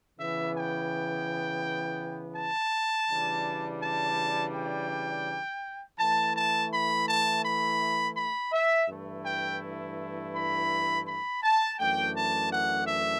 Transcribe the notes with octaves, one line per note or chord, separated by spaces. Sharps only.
C#3 E3 B3 E5
G5
A5
C#3 E3 G3 D4
A5
G5
E3 A3 E4 A5
A5
B5
A5
B5
B5
E5
G2 E3 A3 E4
G5
B5
B5
A5
F#2 E3 A3 D4 G5
A5
F#5
E5